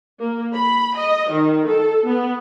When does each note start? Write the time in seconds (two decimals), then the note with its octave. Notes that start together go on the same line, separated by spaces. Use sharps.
0.20 A#3
0.54 B5
0.96 D#5
1.30 D#3
1.66 A4
2.06 B3